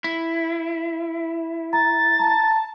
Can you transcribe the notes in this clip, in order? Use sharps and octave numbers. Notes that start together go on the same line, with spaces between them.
E4
A#5 A6
A5 A#5